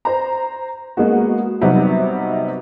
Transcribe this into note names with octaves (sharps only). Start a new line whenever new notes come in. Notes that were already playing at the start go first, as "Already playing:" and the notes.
C5 A#5
G#3 A#3 B3 F#4
C3 F#3 G3 B3 D#4